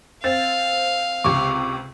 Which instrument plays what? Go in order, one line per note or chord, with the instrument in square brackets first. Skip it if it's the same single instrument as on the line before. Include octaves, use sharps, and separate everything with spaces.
[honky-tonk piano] C4 A6 [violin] F5
[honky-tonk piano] C#2 C3 [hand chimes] C#6 D6